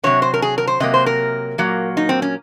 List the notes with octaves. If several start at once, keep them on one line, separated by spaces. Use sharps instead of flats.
C3 D#3 F#3 C#5
C5
A#4
G#4
A#4
C5
C3 F#3 A#3 D#5
C5
A#4
A#2 F#3 A#3
D#4
C4
C#4